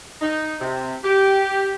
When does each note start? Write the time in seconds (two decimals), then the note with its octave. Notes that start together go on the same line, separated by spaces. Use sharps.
0.21 D#4
0.61 C3
1.04 G4